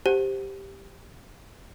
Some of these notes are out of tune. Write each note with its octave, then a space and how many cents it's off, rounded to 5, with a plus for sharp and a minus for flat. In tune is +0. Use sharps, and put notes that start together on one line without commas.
G4 +0 C5 +0 F#5 +0